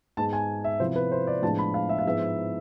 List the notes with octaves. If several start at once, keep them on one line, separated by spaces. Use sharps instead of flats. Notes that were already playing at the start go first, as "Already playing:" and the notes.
G#2 G#3 B3 A5
G#5
E5
C3 F3 B3 E4 C5
B4
C5
D5
A2 F3 G#3 B3 D4 A5
B5
F5
E5
F5
G#2 F3 B3 E4 E5